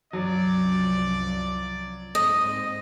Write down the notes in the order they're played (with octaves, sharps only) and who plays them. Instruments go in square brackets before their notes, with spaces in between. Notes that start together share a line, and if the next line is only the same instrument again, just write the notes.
[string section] C2 F#2 F3 [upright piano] F#3 [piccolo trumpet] D5
[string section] G#2 C4 [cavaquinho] D#5